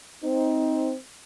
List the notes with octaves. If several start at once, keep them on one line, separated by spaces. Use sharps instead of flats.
C4 D#4